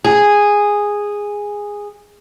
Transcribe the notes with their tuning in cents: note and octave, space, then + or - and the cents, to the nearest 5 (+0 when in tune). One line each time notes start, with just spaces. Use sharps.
G#4 -10